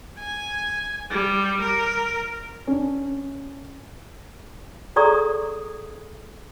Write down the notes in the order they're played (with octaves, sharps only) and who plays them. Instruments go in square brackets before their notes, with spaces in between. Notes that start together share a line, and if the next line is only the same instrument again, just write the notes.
[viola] G#5
G3
A#4
[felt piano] C#4 D4
[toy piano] G#4 A4 D5 A#5 C#6 D#6